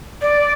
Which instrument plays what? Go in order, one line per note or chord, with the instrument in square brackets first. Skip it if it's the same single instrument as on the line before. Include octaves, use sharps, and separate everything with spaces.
[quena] D5